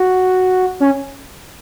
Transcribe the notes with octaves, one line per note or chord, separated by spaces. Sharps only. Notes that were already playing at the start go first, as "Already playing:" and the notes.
Already playing: F#4
C#4